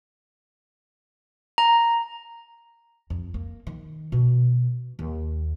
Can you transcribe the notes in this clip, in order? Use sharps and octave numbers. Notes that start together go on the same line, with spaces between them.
A#5
F2
A#3
D#3
B2
D#2